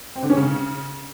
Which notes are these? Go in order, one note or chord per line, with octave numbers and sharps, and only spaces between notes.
C4
D3
C#4
C#3